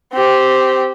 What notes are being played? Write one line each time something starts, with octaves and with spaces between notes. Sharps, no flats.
C4 G4